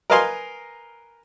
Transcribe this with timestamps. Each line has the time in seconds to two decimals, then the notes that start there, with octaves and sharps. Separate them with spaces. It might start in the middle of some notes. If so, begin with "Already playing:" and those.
0.10 A#4 B4 D#5 F5 G#5 C6